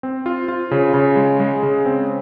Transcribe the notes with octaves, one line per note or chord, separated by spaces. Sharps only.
C4
F4
F4
C#3
C#3
G#3
G#3
C#3
C4